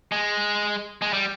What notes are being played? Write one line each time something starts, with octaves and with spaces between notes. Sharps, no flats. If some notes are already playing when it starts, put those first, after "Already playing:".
G#3
G#3
G3